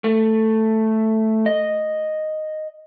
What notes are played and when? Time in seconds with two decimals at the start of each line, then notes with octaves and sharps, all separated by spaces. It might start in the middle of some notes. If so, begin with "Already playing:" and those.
0.04 A3
1.46 D#5